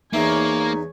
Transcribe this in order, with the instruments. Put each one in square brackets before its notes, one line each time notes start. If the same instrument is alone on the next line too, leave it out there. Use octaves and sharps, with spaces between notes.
[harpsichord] E2 E3 [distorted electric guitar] A#3 [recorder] D#4 [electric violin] C#5 G#5